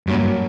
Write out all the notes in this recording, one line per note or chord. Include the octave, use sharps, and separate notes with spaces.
G2 F#3 A#3 C#4